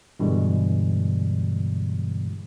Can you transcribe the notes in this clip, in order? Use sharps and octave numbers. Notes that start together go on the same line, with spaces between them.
G2 B2 D3 E3 G3 G#3